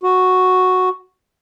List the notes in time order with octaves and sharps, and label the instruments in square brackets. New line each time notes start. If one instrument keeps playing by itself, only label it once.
[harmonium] F#4